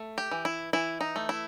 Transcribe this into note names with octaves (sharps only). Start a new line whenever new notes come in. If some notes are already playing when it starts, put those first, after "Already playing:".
Already playing: A3
G4
E3
E4
E3 E4
D#4
A3
E4